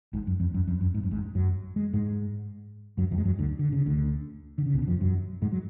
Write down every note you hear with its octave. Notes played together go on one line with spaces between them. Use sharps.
G#1 G#2
F#2
F2
F#2
F2
F#2
G#2
F#2
G#1 G#2
F#2 F#3
G#3
G#2 G#3
F#2 F#3
F2 F3
G#3
F#2 F#3
D2 D3
D3
C#3
D2 D3
D3
C#3
B1 B2
D3
F2 F3
F#2 F#3
G#2 G#3
F#3